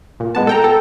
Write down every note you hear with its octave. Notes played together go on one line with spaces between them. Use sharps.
A#2
G#3 B3 A5
A4 G5 A#5
A4